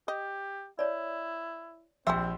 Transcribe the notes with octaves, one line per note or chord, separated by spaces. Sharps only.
G4 D#5
E4 C#5 D5
A#1 G3 C4 E5 G5 C6 E6